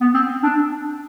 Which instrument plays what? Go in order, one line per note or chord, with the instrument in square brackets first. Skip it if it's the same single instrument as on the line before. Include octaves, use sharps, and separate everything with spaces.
[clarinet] B3
C4
D4